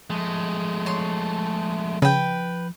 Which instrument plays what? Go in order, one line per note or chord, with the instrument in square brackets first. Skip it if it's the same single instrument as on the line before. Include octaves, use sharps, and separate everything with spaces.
[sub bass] F3 [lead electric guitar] G#3 A3
[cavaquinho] C#5 C6
[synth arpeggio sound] C#3 [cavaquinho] B4 G5